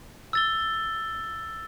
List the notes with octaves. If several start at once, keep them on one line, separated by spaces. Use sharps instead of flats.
E6 A6 G7